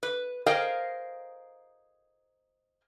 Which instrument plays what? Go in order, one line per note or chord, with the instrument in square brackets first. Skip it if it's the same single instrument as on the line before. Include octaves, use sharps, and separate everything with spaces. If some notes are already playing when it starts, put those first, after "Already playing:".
[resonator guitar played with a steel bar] B4
G#4 A#4 C5 D#5 F5 G5